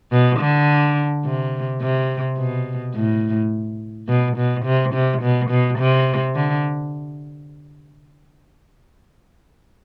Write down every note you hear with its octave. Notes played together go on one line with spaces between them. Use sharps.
B2
D3
C3
C3
B2
A2
B2
B2
C3
C3
B2
B2
C3
D3